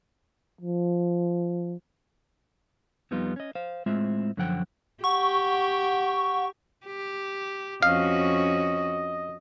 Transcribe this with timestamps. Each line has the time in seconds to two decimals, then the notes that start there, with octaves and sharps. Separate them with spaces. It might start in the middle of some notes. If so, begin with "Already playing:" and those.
0.61 F3
3.11 F2 G3 B3 D#4 F4
3.36 C#4 D#5
3.55 C5 F5
3.86 A2 G#3 C4 F4 E5
4.37 F#2 D3 F3 F#5 G5
5.04 G4 F#5 C#6
6.86 G4
7.83 F2 C#4 F#4 D#5 F5